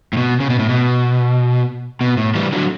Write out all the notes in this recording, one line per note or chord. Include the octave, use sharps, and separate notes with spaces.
A2
B2
C#3
B2
A2
B2
B2
A2
E3 G3
D3 F#3